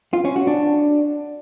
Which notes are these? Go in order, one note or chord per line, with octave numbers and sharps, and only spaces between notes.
F4
C#4
F#4
D4